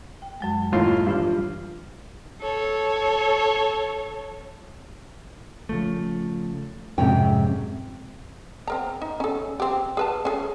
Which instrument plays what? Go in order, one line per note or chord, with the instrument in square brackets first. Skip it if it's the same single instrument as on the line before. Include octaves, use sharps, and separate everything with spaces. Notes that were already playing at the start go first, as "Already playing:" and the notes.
[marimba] G5
F#2 F#3 G#3
[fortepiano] D#2 A2 F4
[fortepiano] G2 [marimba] E3 D4 F4
[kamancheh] A4 C#5
[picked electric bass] C#3 F3 A3
[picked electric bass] F2 F#3 C#4 [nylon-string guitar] G#2 C3 G5
[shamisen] C4 A#4 A#5
D#4
C#4 A4
C4 G4
G#4 B4 A5
C#4 G#4 A4